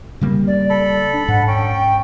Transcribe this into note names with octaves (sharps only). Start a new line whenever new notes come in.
C#3 G3 A#3
D5
A4 B5
D4
G#2 F#5
C#4 G5